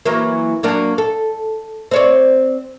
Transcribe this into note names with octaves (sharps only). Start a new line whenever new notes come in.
E3 F#3 A#3
F#3 A#3 D4
A4
C4 C#5 D5